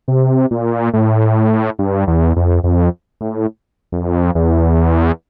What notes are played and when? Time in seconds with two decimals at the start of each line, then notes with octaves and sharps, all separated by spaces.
0.08 C3
0.51 A#2
0.93 A2
1.79 G2
2.07 E2
2.36 F2
2.64 F2
3.21 A2
3.92 F2
4.35 E2